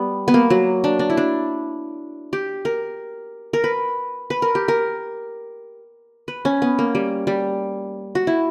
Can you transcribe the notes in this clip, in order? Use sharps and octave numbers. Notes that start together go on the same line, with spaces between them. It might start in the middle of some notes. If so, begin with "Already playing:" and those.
Already playing: G3 B3
B3
A#3
F#3
D4
D4
E4
D4
G4
A#4
A#4
B4
B4
A#4
G4
A#4
B4
C#4
B3
A#3
G3
G3
F#4
E4